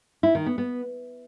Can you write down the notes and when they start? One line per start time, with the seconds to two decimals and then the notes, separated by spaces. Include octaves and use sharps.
0.23 E4
0.35 D#3
0.46 B3
0.58 B3